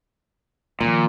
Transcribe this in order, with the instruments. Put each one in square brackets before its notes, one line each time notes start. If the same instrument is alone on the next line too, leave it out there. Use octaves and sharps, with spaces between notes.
[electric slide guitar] A#2 [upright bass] D#3 F3